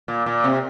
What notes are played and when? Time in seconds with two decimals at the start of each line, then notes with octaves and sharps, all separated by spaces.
0.08 A#2
0.26 A#2
0.44 C3